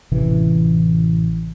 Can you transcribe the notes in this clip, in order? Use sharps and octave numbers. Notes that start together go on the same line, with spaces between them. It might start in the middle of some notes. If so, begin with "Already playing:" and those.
A1 C3 E3